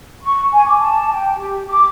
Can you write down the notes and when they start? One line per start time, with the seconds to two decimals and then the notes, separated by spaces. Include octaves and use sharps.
0.22 C#6
0.53 G#5
0.66 D6
0.79 A5
1.12 G5
1.36 G4
1.67 D6